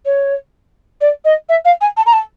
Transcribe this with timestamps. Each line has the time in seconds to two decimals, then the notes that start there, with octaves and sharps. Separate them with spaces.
0.05 C#5
1.01 D5
1.25 D#5
1.49 E5
1.65 F5
1.81 G#5
1.97 A5
2.06 A#5
2.13 A5